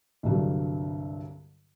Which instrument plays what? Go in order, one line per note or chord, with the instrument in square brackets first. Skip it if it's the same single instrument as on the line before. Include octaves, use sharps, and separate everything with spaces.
[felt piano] C2 G2 D3 F#3